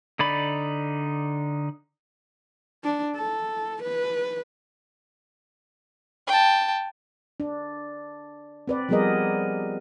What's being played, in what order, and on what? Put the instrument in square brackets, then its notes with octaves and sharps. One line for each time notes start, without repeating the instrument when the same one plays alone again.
[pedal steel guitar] D3 D#4 D5 B5
[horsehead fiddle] D4
A4
B4
[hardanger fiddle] G5 A5
[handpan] D4
C4 B4 D5
F3 G3 B3 G#4 A#4 D#5